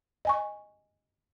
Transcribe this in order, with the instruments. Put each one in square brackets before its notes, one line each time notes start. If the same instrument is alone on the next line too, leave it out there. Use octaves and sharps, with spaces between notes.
[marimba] D#5 G#5 C#6